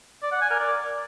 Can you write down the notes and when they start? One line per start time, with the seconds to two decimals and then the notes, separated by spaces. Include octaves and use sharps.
0.23 D5
0.32 F#5
0.41 G#5
0.50 A#4
0.59 D5